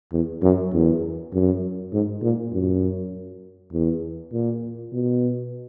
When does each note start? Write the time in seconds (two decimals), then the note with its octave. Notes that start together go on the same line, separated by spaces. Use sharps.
0.12 E2
0.42 F#2
0.73 E2
1.33 F#2
1.93 G#2
2.22 A#2
2.53 F#2
3.73 E2
4.32 A#2
4.93 B2